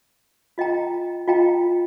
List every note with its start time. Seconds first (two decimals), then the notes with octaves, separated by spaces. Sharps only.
0.58 F4 D#5 G5 A#5
1.28 F4 D#5 G5 A#5